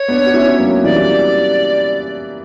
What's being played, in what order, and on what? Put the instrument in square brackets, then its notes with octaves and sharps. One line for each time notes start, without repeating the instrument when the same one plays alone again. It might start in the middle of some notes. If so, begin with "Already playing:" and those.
Already playing: [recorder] C#5
[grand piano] B3 D4
F#4
C#4 E4
F#3 A#3
[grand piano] E3 G3 [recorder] D5